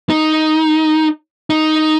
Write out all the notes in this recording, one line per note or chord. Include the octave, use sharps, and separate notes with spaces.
D#4
D#4